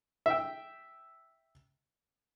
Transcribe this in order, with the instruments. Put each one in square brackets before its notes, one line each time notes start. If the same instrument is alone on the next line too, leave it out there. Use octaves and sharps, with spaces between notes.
[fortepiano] E5 G5